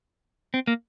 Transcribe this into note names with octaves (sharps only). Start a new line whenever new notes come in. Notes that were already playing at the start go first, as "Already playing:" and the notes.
C4
A#3